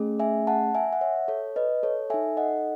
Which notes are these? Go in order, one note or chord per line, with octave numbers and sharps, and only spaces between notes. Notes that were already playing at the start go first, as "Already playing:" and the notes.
Already playing: A3 C#4 G#4
E5 G#5
F#5 A5
E5 G#5
F#5
C#5 E5
A4 C#5
B4 D#5
A4 C#5
D#4 A4 E5 G#5
D#5 F#5